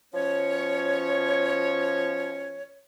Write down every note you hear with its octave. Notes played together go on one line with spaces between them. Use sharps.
B2 F3 C#4 C#5